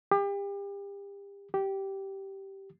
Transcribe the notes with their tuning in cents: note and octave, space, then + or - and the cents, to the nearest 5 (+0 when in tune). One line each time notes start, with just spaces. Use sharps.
G4 +35
G4 -10